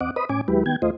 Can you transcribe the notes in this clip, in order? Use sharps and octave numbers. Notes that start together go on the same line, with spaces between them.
E2 C4 D#5 F#5 D6
B4 C5 D#5 B5 D#6
A2 C#4 G#5 D6
D#2 F#3 G#3 E4 G4 B4
D#3 B3 G5 G#6
D#2 A3 F4 C5 D#5